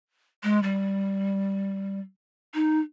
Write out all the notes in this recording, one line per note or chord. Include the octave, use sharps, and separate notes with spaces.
G#3
G3
D#4